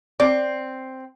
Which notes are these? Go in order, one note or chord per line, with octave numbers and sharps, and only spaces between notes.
C4 D5